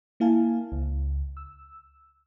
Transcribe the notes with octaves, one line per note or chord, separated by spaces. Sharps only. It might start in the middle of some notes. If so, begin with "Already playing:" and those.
A#3 E4 F5 G#5 A5
C#2
E6